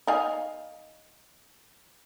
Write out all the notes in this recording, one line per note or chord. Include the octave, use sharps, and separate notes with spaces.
D#4 F5 G#5